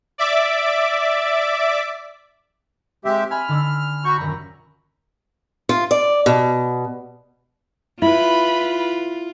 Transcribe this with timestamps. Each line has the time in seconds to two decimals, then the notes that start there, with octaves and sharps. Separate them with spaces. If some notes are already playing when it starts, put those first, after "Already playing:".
0.18 D5 E5 D6
3.05 G#3 C4 G4 E5
3.31 G#5 B5 F6
3.49 D3 D4 E6
4.05 F#4 B5 C#6 G6
4.18 D#1 F#2 A#5
5.69 F4
5.91 D5
6.26 B2
8.02 E4 F4 B4 B5